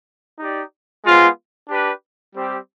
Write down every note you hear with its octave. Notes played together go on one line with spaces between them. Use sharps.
D#4 G4 D5
G#3 B3 F4 C5
D4 G4 B4
G3 C4 G4